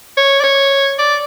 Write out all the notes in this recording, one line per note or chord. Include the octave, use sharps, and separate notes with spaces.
C#5
D5
C#5
D5